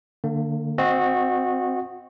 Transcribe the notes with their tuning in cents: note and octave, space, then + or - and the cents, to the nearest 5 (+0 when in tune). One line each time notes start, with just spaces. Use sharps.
D3 +15 A#3 -30
C4 +0 F#4 -20 D#5 +0